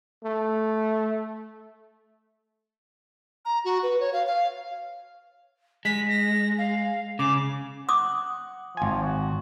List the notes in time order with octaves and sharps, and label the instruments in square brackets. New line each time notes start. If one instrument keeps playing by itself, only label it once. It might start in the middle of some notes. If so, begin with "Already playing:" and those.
[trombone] A3
[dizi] A#5
F#4
B4
C#5
F5
F5
[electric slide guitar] G#3 [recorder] B6
[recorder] A#6
F5
[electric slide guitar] C#3 [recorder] D6
[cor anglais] F#5 [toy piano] D6 D#6
[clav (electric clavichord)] G#1 G#5 [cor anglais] F3
[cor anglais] F#4